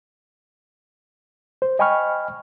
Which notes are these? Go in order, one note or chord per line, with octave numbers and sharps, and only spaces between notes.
C5
D#5 G5 G#5 B5 C#6 F6